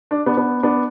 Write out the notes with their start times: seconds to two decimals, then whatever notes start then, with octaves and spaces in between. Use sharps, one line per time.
0.11 D4
0.26 B3 D4
0.37 B3 D4
0.63 B3 D4